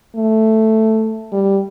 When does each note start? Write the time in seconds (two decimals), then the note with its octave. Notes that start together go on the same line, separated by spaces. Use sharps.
0.16 A3
1.33 G3